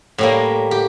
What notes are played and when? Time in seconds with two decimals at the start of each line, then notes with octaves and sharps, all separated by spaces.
0.18 A2 G3 A#3
0.71 G4